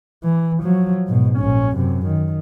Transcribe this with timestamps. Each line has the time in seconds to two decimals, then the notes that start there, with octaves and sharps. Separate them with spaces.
0.23 E3
0.63 F3 F#3
1.07 G#2 B2
1.39 A#1 C#4
1.76 F#2 C3
2.06 D#3